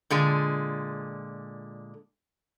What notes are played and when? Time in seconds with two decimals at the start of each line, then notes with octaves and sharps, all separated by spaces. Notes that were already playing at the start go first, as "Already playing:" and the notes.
0.10 A#2 D3 G#3